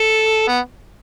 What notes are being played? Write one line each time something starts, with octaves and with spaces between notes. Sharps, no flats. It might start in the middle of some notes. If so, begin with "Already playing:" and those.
Already playing: A4
B3